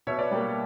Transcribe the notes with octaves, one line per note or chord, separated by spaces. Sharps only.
B2 C#5 E5
B4 D5
G3 A#3 G4 B4